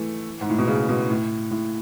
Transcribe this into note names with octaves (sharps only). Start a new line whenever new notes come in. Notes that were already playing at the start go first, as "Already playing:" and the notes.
Already playing: E3 A3
G#2
A2
B2
C#3
B2
A2
A2